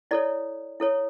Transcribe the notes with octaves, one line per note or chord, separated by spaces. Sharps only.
E4 A4 C#5 D5
E4 A4 C#5